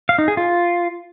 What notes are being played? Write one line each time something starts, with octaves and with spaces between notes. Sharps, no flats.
F5
D#4
G#4
F4